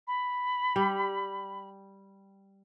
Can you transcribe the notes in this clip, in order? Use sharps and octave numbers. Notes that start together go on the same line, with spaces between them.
B5
G3